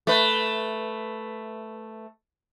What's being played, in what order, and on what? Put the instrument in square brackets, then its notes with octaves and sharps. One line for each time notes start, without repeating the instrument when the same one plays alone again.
[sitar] A3 B4